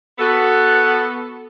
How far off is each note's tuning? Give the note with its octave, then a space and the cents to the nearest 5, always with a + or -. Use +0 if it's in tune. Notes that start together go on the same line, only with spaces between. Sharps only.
B3 +0 F#4 +0 A4 +0